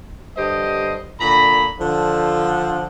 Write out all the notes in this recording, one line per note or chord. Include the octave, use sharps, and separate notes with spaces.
G2 D3 G4 C5 D#5
A#2 D3 A#5 B5
D3 F3